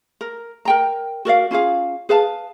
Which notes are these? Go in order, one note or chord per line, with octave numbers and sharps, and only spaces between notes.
A#4
A#4 G5 A#5
F#4 A#4 D5 F5
C#4 F4 G#4 F5
G#4 B4 F5 A5